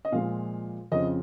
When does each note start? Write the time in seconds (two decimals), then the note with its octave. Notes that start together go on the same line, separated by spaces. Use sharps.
0.05 D#5
0.12 A#2 F3 G#3 F5
0.92 F2 C#3 F3 D#5